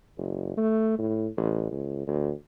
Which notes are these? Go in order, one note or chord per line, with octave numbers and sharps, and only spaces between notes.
F#1
A3
A2
A1
C#2
D2